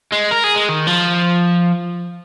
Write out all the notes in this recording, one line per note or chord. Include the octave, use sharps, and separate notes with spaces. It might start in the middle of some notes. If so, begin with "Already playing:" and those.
G#3
A#4
G#4
G#3
D#3
F3